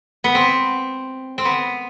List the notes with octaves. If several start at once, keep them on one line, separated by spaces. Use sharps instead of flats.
B3
C4
C4
B3